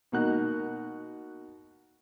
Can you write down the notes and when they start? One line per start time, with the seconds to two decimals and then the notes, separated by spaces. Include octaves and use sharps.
0.12 B2 A#3 D#4 F#4 F#6